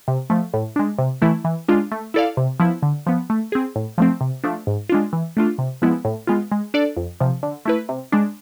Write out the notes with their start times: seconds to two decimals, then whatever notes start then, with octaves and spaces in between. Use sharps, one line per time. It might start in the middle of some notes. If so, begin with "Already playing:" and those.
0.08 C3
0.30 F3 A3
0.54 A2
0.76 G#3 D4
0.99 C3
1.22 E3 A3 E4
1.45 E3
1.68 G#3 D4 F4
1.92 A3
2.14 E4 A4 D5 F5
2.37 C3
2.60 F3 B3 E4
2.82 D3
3.06 F3 B3
3.30 A3
3.52 C4 G#4
3.76 A2
3.98 F3 A3 C4
4.21 C3
4.44 F3 A3 D4
4.67 G#2
4.89 G#3 D4 F4
5.13 E3
5.37 A3 D4 F4
5.58 C3
5.82 F3 G#3 B3 E4
6.05 A2
6.27 G#3 B3 F4
6.52 G#3
6.74 D4 A4 D5
6.97 F2
7.20 C3 F3
7.43 D3
7.65 A3 E4 B4
7.89 C3
8.12 G#3 D4